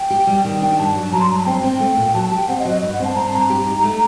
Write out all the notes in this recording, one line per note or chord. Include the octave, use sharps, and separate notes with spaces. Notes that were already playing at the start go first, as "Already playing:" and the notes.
Already playing: G5
G4
G3
D#3 G5
D4 G5
G2 A5
F#3
F#3 A#5
C6
G2 A#5
A5
C4 G5
C4
A3
A#2
F#3 A5
A5
G4
G5
C4 F#5
D#5
F#3
D#5
G2 D#5
F#5
C4 A5
C4 A#5
A5
G2 A#5
G4
D#4
A3